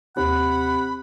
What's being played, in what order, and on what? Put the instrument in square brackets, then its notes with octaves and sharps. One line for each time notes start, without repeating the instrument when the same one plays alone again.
[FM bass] D#2 [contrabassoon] C3 [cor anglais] F#5 [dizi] B5